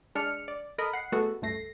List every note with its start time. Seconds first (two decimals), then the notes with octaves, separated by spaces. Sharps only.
0.15 G#3 D4 F6 C#7
0.48 D5
0.78 A4 A#4 D#5 B5
0.93 F#5 C7
1.12 G#3 A3 B3 F#4 A4
1.42 C#2 G2 A3 A#6 C7